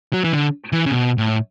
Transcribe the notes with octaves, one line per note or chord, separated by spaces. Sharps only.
F#3
E3
D3
E3
C#3
B2
A2